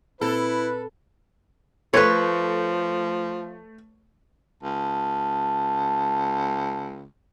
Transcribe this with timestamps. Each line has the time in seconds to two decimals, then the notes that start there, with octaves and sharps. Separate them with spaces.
0.21 A#2 C4 E4 A4 B4
1.94 F3 A3 B4 C#5
4.63 C#2 A5